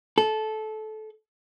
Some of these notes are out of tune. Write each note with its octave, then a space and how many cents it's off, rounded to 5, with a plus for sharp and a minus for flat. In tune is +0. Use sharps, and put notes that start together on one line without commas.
A4 -20